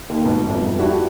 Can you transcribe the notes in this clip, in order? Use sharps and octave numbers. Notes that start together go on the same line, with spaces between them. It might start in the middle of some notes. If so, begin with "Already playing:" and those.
D#2
G#2 B2
G1 F2
D4 E4 F#4 G4